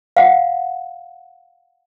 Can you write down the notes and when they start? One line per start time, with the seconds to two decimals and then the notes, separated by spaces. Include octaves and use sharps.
0.17 F5 F#5